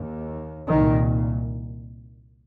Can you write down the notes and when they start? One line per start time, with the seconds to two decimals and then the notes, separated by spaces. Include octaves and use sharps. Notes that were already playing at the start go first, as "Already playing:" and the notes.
Already playing: D#2
0.70 C2 A#2 D#3